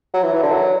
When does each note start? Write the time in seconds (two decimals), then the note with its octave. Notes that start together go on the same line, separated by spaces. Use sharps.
0.14 F#3
0.23 E3
0.33 E3
0.43 D3
0.52 F#3